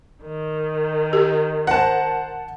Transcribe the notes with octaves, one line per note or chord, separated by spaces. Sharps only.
D#3
G4
A#4 C5 F#5 A5